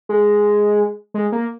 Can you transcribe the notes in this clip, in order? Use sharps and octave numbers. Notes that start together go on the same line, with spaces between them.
G#3
G#3
A#3